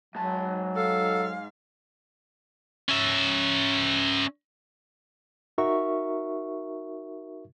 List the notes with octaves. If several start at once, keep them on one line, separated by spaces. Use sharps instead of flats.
G#2 F#3 A5
A4 F5
C#4 E5
D#4 F#4 A#4 E5 C#6